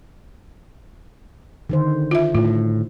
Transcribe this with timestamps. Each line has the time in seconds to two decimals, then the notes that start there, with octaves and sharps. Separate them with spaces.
1.69 D3 D#3 C5
2.11 F4 E5
2.35 A2 F4